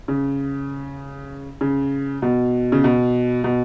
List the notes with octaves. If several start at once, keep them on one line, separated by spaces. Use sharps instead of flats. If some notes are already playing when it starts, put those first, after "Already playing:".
C#3
C#3
B2
C#3
B2
B2